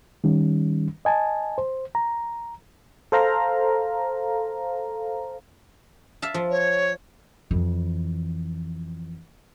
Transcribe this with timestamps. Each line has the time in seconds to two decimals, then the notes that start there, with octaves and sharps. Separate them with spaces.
0.24 D#3 G3 C#4
1.05 D#5 G#5 A5
1.58 C5
1.95 A#5
3.12 A4 C5 F5 A#5
6.22 E5 F5 A5
6.34 F3
6.50 C#5
7.51 F2 E3